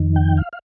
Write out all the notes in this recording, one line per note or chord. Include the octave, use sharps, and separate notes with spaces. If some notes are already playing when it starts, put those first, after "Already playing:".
Already playing: F2 D#3
G5
F5
F5